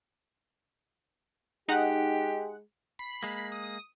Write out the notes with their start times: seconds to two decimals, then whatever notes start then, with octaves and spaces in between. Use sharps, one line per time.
1.69 G#3 D#4 G4 F#5
2.99 B5 B6 C7
3.23 G#3 A#3
3.52 D#6